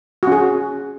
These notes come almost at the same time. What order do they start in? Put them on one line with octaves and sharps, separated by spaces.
F#4 C#4 G#4